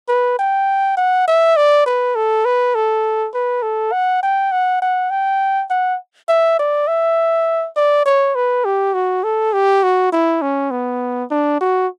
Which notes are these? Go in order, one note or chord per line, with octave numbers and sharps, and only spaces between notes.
B4
G5
F#5
E5
D5
B4
A4
B4
A4
B4
A4
F#5
G5
F#5
F#5
G5
F#5
E5
D5
E5
D5
C#5
B4
G4
F#4
A4
G4
F#4
E4
C#4
B3
D4
F#4